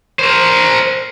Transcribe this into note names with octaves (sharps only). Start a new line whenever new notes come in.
A#4 C5